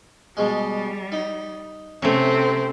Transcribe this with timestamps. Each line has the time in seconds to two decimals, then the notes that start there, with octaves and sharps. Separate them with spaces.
0.37 B2 G3 G#3
1.12 D#4
2.02 C3 A3 C4 C#4